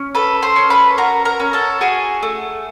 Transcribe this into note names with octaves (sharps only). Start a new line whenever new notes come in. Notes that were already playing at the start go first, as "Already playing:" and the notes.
Already playing: C#4
A4 B4 B5
C5 C6
C#4
B4 B5
F#4 A#4 A#5
A#4 A#5
C#4
A4 A5
F#4 G#4 G#5
A3